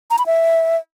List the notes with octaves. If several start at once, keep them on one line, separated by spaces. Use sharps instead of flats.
A#5
B5
E5